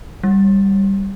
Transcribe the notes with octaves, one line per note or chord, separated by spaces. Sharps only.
G3